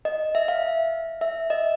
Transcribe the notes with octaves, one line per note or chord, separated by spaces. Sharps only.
D#5
E5
F5
E5
D#5